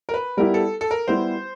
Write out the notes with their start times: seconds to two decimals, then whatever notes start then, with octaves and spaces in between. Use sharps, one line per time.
0.09 A#4
0.14 B4
0.37 G3 B3 E4 G4 A#4
0.54 A4
0.81 A4
0.91 A#4
1.08 G3 B3 E4 G4 C5